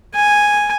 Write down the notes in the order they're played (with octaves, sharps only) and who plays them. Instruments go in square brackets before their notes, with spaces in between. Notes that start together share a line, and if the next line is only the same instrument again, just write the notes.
[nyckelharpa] G#5